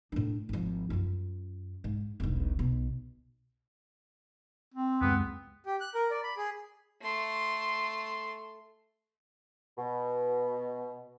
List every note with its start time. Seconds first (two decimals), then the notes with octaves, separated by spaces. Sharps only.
0.12 A2 D4
0.49 G#1 F3
0.90 F#2 F4
1.84 G#2
2.20 E1 B1
2.59 B1 B2
4.74 C4
5.01 C#2 F#2 G#3 B3
5.66 G4
5.80 F#6
5.95 A#4
6.11 D5
6.24 B5
6.37 G#4
7.02 A3 C6
9.78 B2